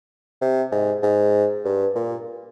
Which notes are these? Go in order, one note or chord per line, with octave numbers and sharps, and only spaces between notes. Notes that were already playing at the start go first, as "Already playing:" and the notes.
C3
G#2
G#2
G2
A#2